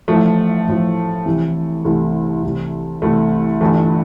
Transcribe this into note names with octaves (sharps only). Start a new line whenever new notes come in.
A1 A2 F3 A3
A1 A2 F3
C2 C3 E3
C2 C3 E3 A3
C2 C3 E3
C2 C3 E3 A3
G1 G2 E3 A3